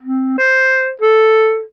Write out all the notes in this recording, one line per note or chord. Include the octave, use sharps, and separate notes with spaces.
C4
C5
A4